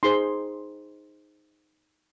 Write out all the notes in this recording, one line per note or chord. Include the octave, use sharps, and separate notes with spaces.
D#4 G#4 C5 C6